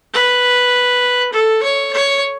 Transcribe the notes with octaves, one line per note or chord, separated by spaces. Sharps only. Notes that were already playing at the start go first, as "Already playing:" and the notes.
B4
A4
C#5
C#5